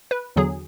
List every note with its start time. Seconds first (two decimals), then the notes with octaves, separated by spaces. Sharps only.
0.11 B4
0.36 E2 D3 F#3 G#4